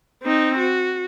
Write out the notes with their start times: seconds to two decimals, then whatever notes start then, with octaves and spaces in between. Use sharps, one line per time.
0.23 C4 D#4
0.58 F#4